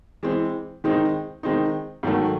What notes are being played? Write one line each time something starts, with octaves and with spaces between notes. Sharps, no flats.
E3 G#3 C4
D#3 G#3 C4 D#4
D#3 G#3 C4 D#4
G#2 D#3 F#3 A3